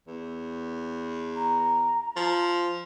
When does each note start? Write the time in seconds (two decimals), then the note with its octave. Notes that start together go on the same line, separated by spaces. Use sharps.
0.07 E2
1.35 A#5
2.16 F3